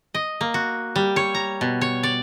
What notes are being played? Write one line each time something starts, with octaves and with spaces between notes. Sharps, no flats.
D#5
A#3
F#4
G3
C#5
A#5
B2
C#5
D5